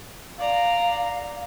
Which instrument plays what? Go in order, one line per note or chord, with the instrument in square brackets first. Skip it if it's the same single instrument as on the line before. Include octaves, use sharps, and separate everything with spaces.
[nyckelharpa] D5 A#5 [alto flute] F5